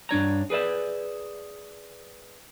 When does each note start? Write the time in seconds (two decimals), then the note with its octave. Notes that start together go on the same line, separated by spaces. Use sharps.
0.09 G2 D4 C#5 A#5
0.50 G#4 B4 D5 E5